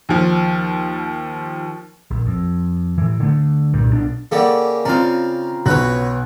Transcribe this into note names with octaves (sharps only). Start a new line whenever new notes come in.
D#2 F3
A#1
F2
A2 E3
D3 A3
C2 G2 A#2
B1 B2 D4
C#3 A#3 G4 A4 D5 F#5
C#3 C4 F4 D5 F5 A#5 F6
B1 F#4 B4 C#5 F#6